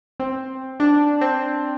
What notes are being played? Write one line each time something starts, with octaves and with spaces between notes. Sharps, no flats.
C4
D4
C4